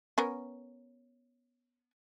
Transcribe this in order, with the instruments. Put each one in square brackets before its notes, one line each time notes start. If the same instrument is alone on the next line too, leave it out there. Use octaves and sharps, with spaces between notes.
[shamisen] B3 C#4 A#4